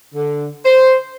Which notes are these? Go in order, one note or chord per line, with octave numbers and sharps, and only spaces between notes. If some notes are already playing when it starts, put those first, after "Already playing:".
D3
C5